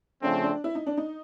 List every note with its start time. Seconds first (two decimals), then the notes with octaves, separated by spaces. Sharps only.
0.22 C#3 F3 A3 C4 D4
0.44 D4
0.64 E4
0.75 D#4
0.86 D4
0.97 D#4